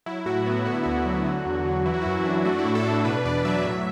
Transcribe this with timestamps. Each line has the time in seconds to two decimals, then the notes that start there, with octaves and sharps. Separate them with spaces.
0.06 F#3 E4
0.26 A2 F#4
0.46 B3
0.65 D3 F#4
0.74 E4
0.83 D2 F#4
1.06 F#3
1.26 D3
1.46 E2
1.65 F#3
1.85 E3 E4
1.94 F#4
2.02 E4
2.06 F#2 F#4
2.17 E4
2.26 D4
2.45 A3 F#4
2.59 E4
2.65 A2 F#4
2.75 A4
2.84 D4
2.90 F#4
2.97 A4
3.05 B2 B4
3.25 E2 D5
3.45 F#3 E5
3.65 A2